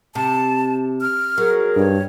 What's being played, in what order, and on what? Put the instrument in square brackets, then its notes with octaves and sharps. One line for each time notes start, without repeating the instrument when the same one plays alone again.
[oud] C3 [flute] A5
[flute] F6
[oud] F#3 [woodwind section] G#4 A#4
[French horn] G2 [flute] C#5